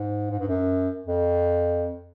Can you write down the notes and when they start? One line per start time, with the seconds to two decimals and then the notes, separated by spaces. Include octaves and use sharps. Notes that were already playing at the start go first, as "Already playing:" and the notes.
Already playing: G#2
0.31 G#2
0.39 G2
0.48 F#2
1.06 F2